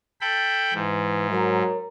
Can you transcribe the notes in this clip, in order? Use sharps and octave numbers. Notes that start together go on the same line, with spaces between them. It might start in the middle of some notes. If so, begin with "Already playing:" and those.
A4 G5 B5
G#2 E3
F#3 A#4 C#5 A#5